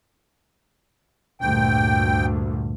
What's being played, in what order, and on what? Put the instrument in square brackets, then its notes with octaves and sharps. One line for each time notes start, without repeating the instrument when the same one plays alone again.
[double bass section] D2 G2 A#2 [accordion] G5